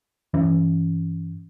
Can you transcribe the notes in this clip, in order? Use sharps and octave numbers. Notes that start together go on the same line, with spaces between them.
G2 E3 C#4